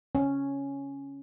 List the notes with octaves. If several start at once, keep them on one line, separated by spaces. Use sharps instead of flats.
C#4